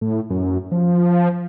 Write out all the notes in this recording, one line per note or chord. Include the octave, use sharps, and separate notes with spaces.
A2
F#2
F3